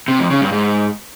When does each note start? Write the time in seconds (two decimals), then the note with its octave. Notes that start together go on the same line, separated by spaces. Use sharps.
0.08 C3
0.19 F2
0.30 C#3
0.41 G2
0.52 G#2